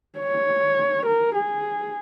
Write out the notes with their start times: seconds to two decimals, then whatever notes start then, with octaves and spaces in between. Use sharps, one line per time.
0.19 C#5
1.06 A#4
1.35 G#4